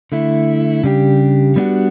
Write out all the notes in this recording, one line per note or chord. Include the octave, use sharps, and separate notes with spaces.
D3 A3 E4
C#3 G3 D4 G4
G3 B3 D4 F#4